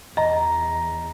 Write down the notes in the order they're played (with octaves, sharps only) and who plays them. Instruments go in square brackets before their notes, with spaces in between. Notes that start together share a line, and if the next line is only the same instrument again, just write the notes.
[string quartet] E2 [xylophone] D#5 [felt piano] A#5